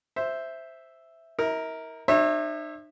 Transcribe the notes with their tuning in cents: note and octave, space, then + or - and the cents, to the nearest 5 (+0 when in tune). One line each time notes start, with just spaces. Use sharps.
C5 +0 E5 +0
E4 -45 A#4 +0
D#4 -45 C#5 -40 E5 +0